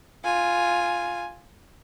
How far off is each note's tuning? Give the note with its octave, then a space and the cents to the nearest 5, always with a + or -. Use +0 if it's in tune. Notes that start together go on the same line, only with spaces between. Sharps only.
F4 +0 G#5 +0